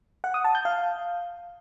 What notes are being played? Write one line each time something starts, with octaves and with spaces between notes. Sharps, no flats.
F#5
D#6
A5
G6
F5